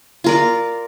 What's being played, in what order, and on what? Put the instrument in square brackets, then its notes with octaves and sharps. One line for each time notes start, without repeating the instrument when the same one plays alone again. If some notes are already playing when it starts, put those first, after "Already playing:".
[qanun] F4 A#4 D5